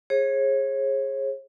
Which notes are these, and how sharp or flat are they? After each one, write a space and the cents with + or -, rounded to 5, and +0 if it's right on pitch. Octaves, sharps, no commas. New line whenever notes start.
G#4 +0 C#5 -40